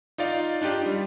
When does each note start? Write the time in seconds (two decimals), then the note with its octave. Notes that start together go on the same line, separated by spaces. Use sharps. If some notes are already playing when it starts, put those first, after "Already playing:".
0.18 D#4 F4 D5 F5
0.62 D4 D#4 F4 G4
0.86 G3